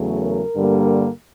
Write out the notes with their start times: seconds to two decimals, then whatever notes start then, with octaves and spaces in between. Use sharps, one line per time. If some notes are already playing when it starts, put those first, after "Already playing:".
Already playing: E2 C#3 F#3 A3
0.21 A#4
0.55 G2 D3 G3 A#3